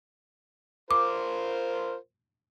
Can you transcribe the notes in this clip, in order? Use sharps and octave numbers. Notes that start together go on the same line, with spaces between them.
F4 A#4 C5 D6